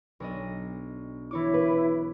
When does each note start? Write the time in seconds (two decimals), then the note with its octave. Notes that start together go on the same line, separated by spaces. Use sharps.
0.20 B1 D4 D#5
1.31 E3 E4 C#5 D6
1.54 B4